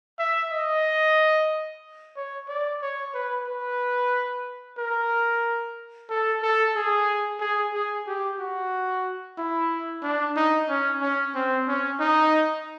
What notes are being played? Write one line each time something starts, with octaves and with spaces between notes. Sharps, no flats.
E5
D#5
C#5
D5
C#5
B4
B4
A#4
A4
A4
G#4
G#4
G#4
G4
F#4
E4
D4
D#4
C#4
C#4
C4
C#4
D#4